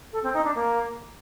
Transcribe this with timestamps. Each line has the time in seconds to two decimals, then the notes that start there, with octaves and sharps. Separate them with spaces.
0.13 A4
0.23 C4
0.34 D#4
0.44 D4
0.55 A#3